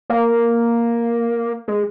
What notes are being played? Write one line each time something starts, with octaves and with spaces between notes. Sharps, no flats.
A#3
G#3